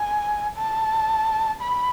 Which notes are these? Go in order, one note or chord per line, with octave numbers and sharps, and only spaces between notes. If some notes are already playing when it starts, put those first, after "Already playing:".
Already playing: G#5
A5
B5